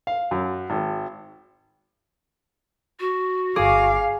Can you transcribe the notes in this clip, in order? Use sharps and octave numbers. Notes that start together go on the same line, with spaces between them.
F5
F#2
G#1
F#4
G1 G#4 F5 D6